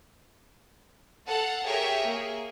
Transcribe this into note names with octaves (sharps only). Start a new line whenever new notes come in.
A4 F5 F#5 A5
G4 G#4 A#4 C#5 E5 G5
A#3 G#4